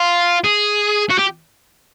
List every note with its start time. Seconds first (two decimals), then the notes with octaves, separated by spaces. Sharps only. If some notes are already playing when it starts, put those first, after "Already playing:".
Already playing: F4
0.44 G#4
1.10 F#4
1.19 G4